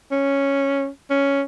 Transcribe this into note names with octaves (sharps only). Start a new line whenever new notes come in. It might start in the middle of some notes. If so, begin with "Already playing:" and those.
C#4
C#4